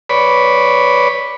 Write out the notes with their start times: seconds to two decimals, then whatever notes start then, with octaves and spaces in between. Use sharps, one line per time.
0.10 B4 C#5 D5 B5